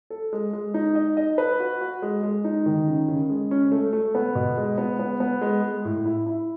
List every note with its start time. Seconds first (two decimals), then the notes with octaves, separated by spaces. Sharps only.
0.10 A4
0.33 G#3
0.53 G#3
0.74 D#4
0.95 D#5
1.17 D#5
1.38 B4
1.60 F#4
1.81 F#4
2.02 G#3
2.23 G#3
2.44 D#4
2.66 D#3
2.87 C#3
3.08 C#3
3.30 G#3
3.51 C#4
3.72 A3
3.93 A3
4.15 B3
4.35 B2
4.57 G#3
4.78 B3
4.99 B3
5.20 B3
5.41 G#3
5.63 G#3
5.85 A2
6.05 E4
6.26 E4